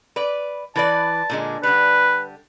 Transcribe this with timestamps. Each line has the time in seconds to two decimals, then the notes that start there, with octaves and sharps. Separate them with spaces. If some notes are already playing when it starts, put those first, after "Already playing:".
0.16 B4 D5
0.76 E3 B4 D5 A5
1.30 A#2 D3 G#3
1.63 D3 G3 B4